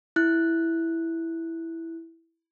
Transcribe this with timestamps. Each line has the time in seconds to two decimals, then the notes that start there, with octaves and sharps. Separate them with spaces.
0.16 E4 F#6